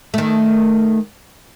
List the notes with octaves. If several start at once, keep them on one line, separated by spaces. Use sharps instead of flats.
D#3 A3